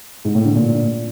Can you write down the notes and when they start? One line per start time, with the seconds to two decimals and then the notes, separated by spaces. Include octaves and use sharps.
0.25 G#2
0.35 A2
0.45 D3
0.55 A#2